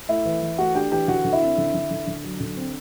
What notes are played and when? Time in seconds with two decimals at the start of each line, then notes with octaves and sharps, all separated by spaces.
0.09 A3 E4 E5
0.25 E3
0.42 E3
0.58 A3 F#4 F#5
0.75 D4 G4 G5
0.92 E3 G4 G5
1.08 D3 F#4 F#5
1.25 D3
1.33 E4 E5
1.42 C4
1.58 D3
1.74 D3
1.91 D3
2.07 D3
2.24 F#3
2.40 D3
2.57 C4